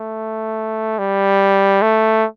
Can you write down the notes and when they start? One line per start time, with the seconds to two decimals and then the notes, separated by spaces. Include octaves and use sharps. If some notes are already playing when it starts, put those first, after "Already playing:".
Already playing: A3
0.99 G3
1.82 A3